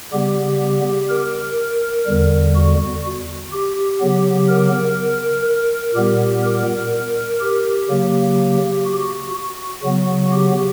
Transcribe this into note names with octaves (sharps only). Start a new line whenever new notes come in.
C#3 G3 B3 G4
A#4
E2 D3 G3
F#4
G4
C#3 F#3 B3
A#4
A#4
A#2 G3 B3 G4
A#4
G4
C#3 F#3 A#3
F#4
F#4
C#3 F#3 B3
G4